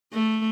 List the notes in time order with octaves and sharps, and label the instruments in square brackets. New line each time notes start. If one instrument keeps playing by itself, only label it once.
[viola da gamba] A3